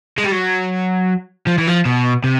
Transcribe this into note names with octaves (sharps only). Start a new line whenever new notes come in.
G#3
G3
F#3
F3
E3
F3
B2
C3